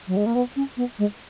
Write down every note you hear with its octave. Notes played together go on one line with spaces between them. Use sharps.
F#3
G#3
A#3
B3
C#4
B3
G#3